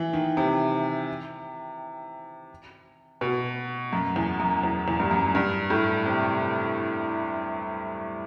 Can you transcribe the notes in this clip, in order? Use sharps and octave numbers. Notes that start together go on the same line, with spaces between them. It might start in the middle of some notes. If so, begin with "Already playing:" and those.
Already playing: E3
D#3
C3
B2
F#2
E2
F#2
E2
E2
G2
F#2
G2
A2
C3